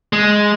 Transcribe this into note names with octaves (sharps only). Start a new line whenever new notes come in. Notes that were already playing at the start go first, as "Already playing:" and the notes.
G#3